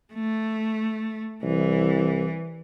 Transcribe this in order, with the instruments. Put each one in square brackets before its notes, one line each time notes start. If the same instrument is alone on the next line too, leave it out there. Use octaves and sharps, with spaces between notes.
[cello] A3
[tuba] C2 [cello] E3